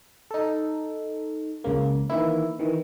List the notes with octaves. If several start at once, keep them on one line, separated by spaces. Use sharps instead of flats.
D#4 A4
C#2 C#3 A#3
D#3 E3 A#3 E4
D#3 E3